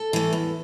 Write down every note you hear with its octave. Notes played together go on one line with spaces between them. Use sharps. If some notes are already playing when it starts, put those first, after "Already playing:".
Already playing: A4
E3 A3
E2